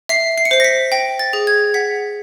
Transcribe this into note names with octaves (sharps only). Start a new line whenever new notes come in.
E5 C7
C7
C#7
C5 C7
A#6
B6
G5 A#6
A6
G#4
G#6
F#5 B6